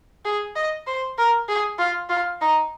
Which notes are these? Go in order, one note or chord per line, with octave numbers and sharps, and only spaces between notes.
G#4
D#5
C5
A#4
G#4
F4
F4
D#4